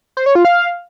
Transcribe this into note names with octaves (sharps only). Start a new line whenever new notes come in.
C5
C#5
F4
F5